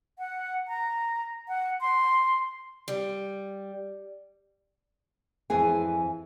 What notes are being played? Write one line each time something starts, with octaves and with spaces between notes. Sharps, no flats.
F#5
A#5
F#5
C6
G3
F2 E3 G#4 G#5